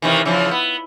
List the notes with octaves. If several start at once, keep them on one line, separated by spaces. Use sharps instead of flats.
C3 D#3 E3
C#3 E3 F3
B3